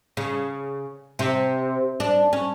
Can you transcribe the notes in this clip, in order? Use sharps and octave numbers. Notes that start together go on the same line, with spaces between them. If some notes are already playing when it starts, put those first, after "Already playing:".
C#3
C3
D4
C#4